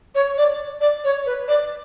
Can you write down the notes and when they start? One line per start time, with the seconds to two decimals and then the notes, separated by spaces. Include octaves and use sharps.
0.15 C#5
0.37 D5
0.81 D5
1.04 C#5
1.26 B4
1.48 D5